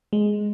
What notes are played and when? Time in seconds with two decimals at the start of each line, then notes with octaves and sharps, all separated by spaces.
0.13 G#3